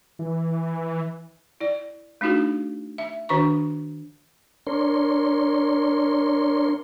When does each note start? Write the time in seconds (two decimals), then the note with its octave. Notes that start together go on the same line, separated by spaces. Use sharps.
0.19 E3
1.60 E4 D5
2.21 A3 D4 D#4 F4 F#4 G#4
2.98 E5
3.29 D#3 D4 F#4 B4 A#5 C#6
4.67 D4 A#4 C#5 C6